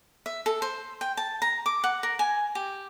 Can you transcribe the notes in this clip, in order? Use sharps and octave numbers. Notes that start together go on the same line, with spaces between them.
E5
A4
C5
G5
A5
A#5
D6
F#5
A#4
G#5
G4